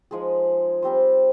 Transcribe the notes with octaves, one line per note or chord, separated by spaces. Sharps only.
F3 G#3 D#4 G#4
G3 C4 G4 C5